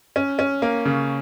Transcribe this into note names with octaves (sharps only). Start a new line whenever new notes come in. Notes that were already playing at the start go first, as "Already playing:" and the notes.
C#4
C#4
A#3
C#3